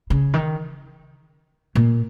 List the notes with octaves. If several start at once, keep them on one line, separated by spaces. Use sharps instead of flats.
C#3
D#3
A#2